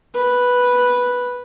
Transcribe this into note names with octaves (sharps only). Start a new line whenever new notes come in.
B4